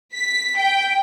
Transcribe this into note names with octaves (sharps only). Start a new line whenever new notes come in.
B6
G5